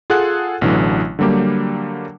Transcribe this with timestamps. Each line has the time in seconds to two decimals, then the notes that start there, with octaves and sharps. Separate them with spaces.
0.10 F4 G#4 A4 F#5 F#6
0.61 A1 B2 D3 E3 F#3
1.19 D3 F#3 G3 A#3 G4